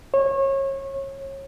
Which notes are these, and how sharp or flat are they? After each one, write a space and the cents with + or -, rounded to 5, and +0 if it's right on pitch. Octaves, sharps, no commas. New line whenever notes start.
C#5 -30